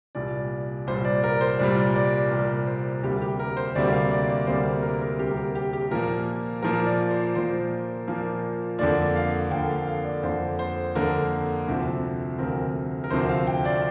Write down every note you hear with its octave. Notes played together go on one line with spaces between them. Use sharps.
C2 A#2 G3 D5
C2 A#2 G3 C5
D5
A#4
C5
C2 A#2 G3 D5
D5
C2 A#2 G3 A#4
C5
D2 C3 G3 A#3 G4
G4
A#4
C5
D2 C3 G3 A#3 D5
F5
D5
D5
D2 C3 G3 A#3 C5
A#4
A#4
D2 C3 G3 A#3 G4
A#4
G4
G4
G4
A#2 F3 A#3 A#4
A#2 F3 A#3 A#4
D5
C5
A#2 F3 A#3 C5
A#2 F3 A#3
F2 D3 A#3 D5
F5
F2 D3 A#3 G5
F5
F5
D5
F2 D3 A#3 C5
C5
F2 D3 A#3 A#4
D2 C3 F3 C4
D2 C3 F3 C4 A#4
A#4
D2 C3 F3 C4 C5
F5
G5
D5